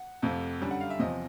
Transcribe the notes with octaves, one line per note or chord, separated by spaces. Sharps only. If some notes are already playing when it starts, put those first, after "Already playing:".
Already playing: F#5
F2 C3 F3 A3
F#2 D3 G3
F#5
F5
E5
E2 C3 F3 D#5